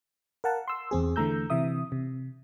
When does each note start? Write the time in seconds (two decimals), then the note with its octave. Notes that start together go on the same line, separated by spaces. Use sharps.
0.44 A#4 F5 F#5 A5
0.68 C6 E6
0.91 E2 C4 G#4
1.16 D3 E3 A3 A#5 E6 G6
1.50 C3 E3 E5 D#6
1.92 C3